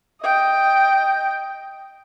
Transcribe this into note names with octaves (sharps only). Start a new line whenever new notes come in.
D#5 G5